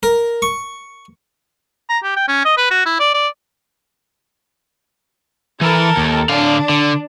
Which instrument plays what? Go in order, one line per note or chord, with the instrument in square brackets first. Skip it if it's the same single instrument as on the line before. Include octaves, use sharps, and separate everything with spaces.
[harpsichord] A#4
C#6
[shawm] A#5
G4
G5
C#4
D#5
B4
F#4
E4
D5
D5
[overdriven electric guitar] E3 [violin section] A4 A#4
[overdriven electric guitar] D#2
[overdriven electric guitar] D3 F5 [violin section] D4
[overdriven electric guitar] D3